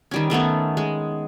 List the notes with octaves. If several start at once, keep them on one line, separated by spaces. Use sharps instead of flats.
D#3 G3 C#4
D#3 A3 B3 C#4
G#3